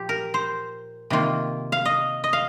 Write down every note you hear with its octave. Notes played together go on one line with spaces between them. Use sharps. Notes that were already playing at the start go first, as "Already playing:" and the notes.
Already playing: A#2 F3 G4
A#4
C5
C3 D#3 A#3 F4
F5
D#5
D#5
F5